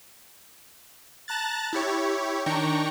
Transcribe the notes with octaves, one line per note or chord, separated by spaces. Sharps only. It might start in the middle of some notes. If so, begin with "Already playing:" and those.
A5 A#5 F#6 A6
E4 G4 C#5
D#3 D4 G5 A#5 C#6